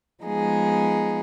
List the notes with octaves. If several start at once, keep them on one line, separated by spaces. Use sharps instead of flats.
F3 G#3 B3 D#4 G#4